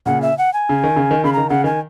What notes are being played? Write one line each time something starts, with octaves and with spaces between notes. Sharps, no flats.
A#2 C#3 F#5
E5
F#5
G#5
C#3
D#3
C#3
D#3
C#3 B5
D#3 A#5
C#3 F#5
D#3 G#5